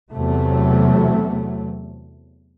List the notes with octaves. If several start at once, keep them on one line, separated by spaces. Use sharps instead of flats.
E2 C3 F#3 A3